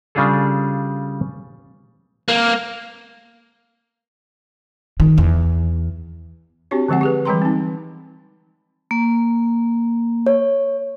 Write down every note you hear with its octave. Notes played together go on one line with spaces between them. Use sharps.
C#3 G3 D4 F4 G#4 A4
A#3
D#3
E2
C4 D4 F#4 G4 C#5
D3 F3 G#3 C4 F#5
G4 G#4 B4
E3 G3 G#3 G5 A#5 C6
C4 D#4
A#3
C#5